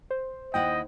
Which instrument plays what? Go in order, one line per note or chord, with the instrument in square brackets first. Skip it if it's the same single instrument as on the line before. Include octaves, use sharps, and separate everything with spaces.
[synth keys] C5
[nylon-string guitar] D#2 E4 F#5 [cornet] D#5 [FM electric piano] G5